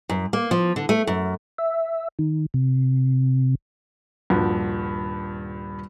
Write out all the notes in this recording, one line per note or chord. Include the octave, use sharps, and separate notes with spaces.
F#2
A#3
F3
D3
A3
F#2
E5
D#3
C3
D#1 G2 F3 F#4